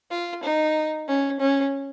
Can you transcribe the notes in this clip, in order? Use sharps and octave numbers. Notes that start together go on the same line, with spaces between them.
F4
D#4
C#4
C#4